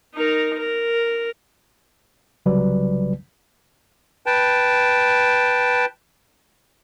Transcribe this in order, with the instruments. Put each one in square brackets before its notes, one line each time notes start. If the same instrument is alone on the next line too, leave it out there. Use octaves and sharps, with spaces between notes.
[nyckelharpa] D#4 A#4
A#4
[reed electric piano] C2 C#3 F#3 G3 B4 D5
[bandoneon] B4 G5 A5